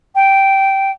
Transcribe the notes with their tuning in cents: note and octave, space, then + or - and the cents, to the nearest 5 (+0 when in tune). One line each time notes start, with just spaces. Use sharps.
G5 -10